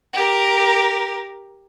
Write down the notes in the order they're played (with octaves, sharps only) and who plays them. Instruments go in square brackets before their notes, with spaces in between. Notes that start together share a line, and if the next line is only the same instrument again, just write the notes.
[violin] G4 A#4